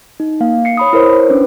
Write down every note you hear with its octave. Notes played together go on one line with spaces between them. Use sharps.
D#4
A#3 F5
C7 C#7
C#5 B5 D#6
E4 A#4 C5 C#5
C#4 D4 B4